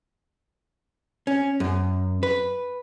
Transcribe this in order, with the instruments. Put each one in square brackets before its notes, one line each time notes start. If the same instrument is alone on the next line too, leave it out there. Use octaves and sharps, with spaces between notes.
[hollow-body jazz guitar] C#4
F#2
B4